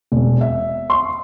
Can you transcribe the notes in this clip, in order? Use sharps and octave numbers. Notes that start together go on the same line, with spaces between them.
E1
E5
C6